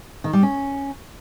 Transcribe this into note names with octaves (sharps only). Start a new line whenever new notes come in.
D#3
G3
C#4